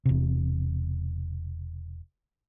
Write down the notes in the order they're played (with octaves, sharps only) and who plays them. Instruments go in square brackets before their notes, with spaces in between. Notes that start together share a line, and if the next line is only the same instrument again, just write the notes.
[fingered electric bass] E1 C3